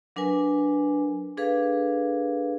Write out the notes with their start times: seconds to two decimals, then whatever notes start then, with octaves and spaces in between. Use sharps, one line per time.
0.16 F#3 D4 A#4 B4 G#5
1.37 D4 G#4 A4 B4 F5